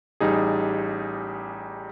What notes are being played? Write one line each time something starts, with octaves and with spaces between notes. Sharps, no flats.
A1 G3 D#4 G#4